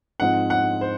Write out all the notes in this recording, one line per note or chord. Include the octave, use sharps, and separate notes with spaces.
G#2 F3 C4 F#5
F#5
C5